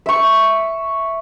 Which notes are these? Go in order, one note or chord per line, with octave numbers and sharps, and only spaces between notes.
E5 C#6